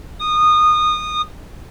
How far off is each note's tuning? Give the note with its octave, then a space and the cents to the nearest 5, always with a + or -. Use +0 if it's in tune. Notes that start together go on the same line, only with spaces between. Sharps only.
D#6 -20